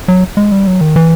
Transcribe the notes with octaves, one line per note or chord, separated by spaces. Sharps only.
F#3
G#3
G3
F#3
D#3
E3